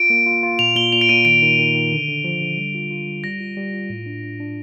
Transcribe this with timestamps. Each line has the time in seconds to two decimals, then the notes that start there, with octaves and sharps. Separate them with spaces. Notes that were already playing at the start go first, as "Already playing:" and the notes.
Already playing: F4 D7
0.10 A#3
0.26 F4
0.43 F4
0.59 A#2 F7
0.76 A#2 G7
0.92 A#2 F7
1.01 D7
1.09 A#2 D#7
1.25 D#3 D7
1.42 D#3
1.59 D#3
1.75 D#3
1.92 D3
2.08 D3
2.24 F3
2.41 D3
2.57 G3
2.75 F4
2.91 F4
3.07 G3
3.24 G3 A#6
3.40 F4
3.57 G3
3.73 F4
3.90 A2
4.06 D4
4.23 D4
4.40 D4